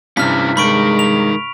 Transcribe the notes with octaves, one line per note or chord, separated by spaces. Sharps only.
G2 C3 C#4 E4 G4 F6 B6
G#3 D#4 A#4 B5 C#6 D7
F7